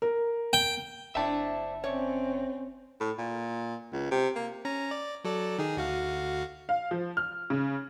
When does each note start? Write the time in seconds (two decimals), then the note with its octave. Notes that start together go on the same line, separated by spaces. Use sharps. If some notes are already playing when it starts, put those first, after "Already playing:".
0.02 A#4
0.53 G5
1.15 F#1 C4 D4 E4 E5 A5
1.84 C4 C#4 C#5 D5
3.00 A2
3.18 A#2
3.93 C#2
4.11 C3
4.36 A#3
4.65 C#4 A#5
4.91 D5
5.24 F#3 A4 D5
5.58 D#3 D#4 G#4
5.77 D2 F#4 F5
6.69 F5
6.91 F3
7.17 F6
7.50 C#3